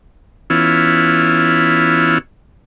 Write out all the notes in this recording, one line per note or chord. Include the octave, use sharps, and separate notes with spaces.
E3 B3 C#4 E4 F4